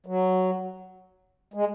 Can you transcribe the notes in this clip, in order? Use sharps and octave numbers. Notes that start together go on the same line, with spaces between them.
F#3
G#3